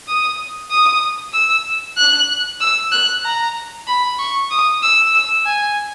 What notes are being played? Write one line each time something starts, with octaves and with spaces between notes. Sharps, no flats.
D#6
D#6
E6
F#6
E6
F#6
A#5
B5
C#6
D#6
E6
E6
G#5